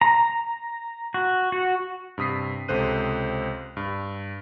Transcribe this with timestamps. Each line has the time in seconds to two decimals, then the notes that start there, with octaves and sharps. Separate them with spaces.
0.01 A#5
1.14 F#4
1.52 F#4
2.18 G2 C3 D#6 B6 C7
2.68 C#2 C3 A4 C5 F#6 D#7
3.77 G2